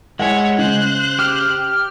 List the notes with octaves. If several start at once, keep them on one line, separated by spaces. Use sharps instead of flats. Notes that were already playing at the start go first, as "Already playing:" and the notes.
G#3 E4 C#5 F#5 G#5
C#3 C5 F#6
G4 F6